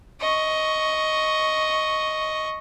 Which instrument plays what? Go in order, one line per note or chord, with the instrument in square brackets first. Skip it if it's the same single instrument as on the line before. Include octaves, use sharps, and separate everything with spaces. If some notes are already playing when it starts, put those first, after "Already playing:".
[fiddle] D#5 C#6